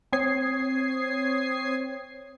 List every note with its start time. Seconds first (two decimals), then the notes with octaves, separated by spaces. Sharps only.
0.13 C4 C#5 D#6 G#6 C7